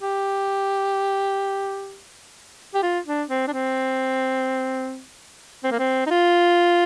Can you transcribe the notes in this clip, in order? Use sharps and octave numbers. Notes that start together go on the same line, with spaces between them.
G4
G4
F4
D4
C4
D4
C4
C4
A#3
C4
D#4
F4